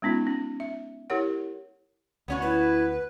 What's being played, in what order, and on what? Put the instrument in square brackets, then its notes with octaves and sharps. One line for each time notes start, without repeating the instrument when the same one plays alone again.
[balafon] G#3 B3 C#4 D#4 F4
C#4
E5
E4 G4 A#4 C#5 F#5
[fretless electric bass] D2 [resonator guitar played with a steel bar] B3 C#4 F#4
[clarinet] E4 [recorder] B4